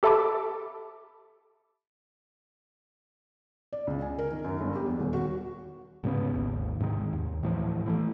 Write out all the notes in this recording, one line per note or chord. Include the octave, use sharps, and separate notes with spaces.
G4 A4 E5 A5 B5 D6
D5
C#2
G#5
A#4
D#3
F#2
G1
G4
E2
D#1
F#4
D2 G#2 C#3 B3
G#1 D#2
G#2 C3 D#3 G#3
D#2
A2 E3 F3
E3 G3 A3